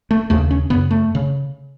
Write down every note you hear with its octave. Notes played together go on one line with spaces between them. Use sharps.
A3
D#2 C#3 A3
C#4
F#2 C#3 B3
A3
C#3